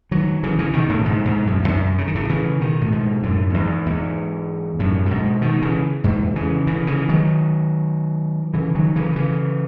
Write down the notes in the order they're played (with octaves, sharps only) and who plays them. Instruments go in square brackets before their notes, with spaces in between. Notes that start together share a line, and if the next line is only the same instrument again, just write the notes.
[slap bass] D#3 F#3
C#3 E3
C#3 E3
B2 D#3
A2 C#3
G#2 B2
G#2 B2
F#2 A2
E2
F#2
C#3
D#3
A2 C#3
C#3 E3
B2 D#3
A2
G#2 B2
F#2 A2
F#2
E2 G#2
E2 G#2
F#2 A2
A2
G#2 B2
B2 D#3
C#3 E3
E2 G#2
C#3 E3
C#3 E3
C#3 E3
D#3 F#3
C#3 E3
D#3 F#3
C#3 E3
D#3
C#3 E3